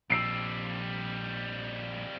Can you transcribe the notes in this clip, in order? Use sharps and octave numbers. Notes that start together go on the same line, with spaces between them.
A#1 F2 G3 E6 C7 D7